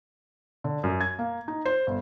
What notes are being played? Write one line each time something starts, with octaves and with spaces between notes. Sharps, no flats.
D3
F#2
G#6
A#3
D#4
C5
G1